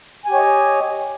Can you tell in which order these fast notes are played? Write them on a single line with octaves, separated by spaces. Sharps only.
G#5 G4 C#5 D#5